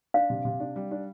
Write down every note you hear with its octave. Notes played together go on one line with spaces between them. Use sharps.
D4 F5
C3
C3
D4
G3
D4